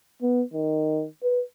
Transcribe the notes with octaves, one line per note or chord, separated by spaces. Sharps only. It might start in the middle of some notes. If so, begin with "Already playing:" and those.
B3
D#3
B4